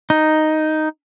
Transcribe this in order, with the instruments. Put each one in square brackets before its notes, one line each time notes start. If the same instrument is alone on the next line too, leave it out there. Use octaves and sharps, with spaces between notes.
[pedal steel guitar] D#4